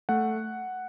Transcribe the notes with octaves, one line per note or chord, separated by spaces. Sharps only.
A3 F#5